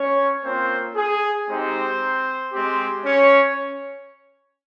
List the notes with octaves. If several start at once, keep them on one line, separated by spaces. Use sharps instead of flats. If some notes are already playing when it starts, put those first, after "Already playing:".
Already playing: C#4 C#5
A#3 C4 C#4 F4 C5
G#4
G#3 C4 D#4 G4 C5
G#3 C4 G4
C#4 C#5